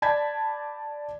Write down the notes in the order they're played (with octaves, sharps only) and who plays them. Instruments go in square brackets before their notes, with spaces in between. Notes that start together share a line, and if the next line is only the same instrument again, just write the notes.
[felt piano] D5 A5 B5 G6 G#6 B6